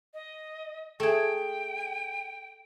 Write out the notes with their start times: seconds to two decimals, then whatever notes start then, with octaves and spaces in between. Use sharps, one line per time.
0.14 D#5
1.00 A3 G#4 G5